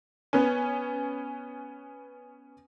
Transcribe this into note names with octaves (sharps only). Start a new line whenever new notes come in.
B3 C#4